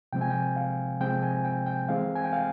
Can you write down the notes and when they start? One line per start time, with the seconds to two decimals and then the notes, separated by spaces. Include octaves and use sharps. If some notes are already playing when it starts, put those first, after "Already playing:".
0.13 C3 F3 G#3 C4 G5
0.21 G#5
0.30 G5
0.56 F5
1.01 C3 F3 G#3 C4 G5
1.22 G#5
1.45 G5
1.66 G5
1.89 E3 G#3 C4 F5
2.16 G#5
2.24 G5
2.33 F5